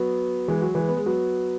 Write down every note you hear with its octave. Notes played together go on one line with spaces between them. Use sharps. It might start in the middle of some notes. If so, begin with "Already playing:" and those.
Already playing: F#3 B3
E3 G#3
F#3
E3 G#3
B3
G#3
F#3 B3